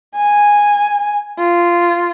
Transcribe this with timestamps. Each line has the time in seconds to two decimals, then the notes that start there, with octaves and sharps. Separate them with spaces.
0.16 G#5
1.38 F4